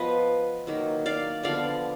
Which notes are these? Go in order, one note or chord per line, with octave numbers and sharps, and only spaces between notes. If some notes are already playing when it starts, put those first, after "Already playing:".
Already playing: F3 B3 B4 D#5
D#3 F#3 A#3
D5 F5
D3 F3 B3 D5 F5